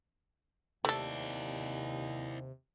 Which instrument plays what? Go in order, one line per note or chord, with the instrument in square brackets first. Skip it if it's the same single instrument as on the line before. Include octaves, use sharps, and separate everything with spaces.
[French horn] D#2 [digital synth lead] C3 [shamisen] A3 A4 [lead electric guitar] E4 D5